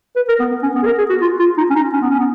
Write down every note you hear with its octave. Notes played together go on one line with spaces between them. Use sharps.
B4
A#4
B3
B3
C#4
B3
G#4
A#4
G#4
F#4
F4
F4
D#4
C#4
D#4
C#4
B3
C#4
B3